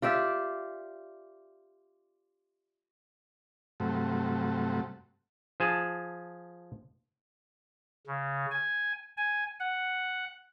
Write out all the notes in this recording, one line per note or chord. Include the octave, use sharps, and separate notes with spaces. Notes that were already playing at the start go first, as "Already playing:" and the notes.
F4 G4 D5 E5
G2 C3 F#3 A3
F3 G#4 A5
C#3
G#5
G#5
F#5